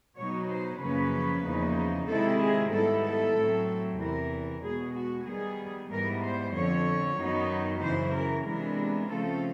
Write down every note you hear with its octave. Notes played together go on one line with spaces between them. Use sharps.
B2 F#3 B3 D#4 C#5
C5
F#2 C#3 F3 A#3 C#4 B4
E2 C#3 F3 A#3 D#4
C3 D#3 G#3 C4 E4 A4
G#4
G#2 D#3 G3 B3 E4 A4
A4
A2 F#3 A3 C4
E2 C3 E3 A#4
B2 G#3 B3 G#4
F#4
D#3 G3 B3 G#4
G#2 E3 G3 B3 A#4
C5
F2 D3 F3 C#5
F#2 D#3 F#3 B3 D#4
F#2 C#3 E3 C5
A#4
C3 E3 G#3 B3 D4 A#4
C#3 F3 A3 C4 F4 A4